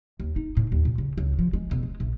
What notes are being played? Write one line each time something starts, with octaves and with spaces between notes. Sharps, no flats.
D#2
D#4
A2
D#2
A#2
C#3
C#2
F3
G#3
E1
G#3
A#1